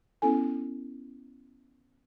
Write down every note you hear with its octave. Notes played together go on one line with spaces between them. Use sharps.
B3 C#4 E4 A4 G#5